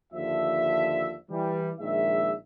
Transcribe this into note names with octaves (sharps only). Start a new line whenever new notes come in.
D#2 D3 F3 E5
E3 G3
A#1 D#3 G#3 E5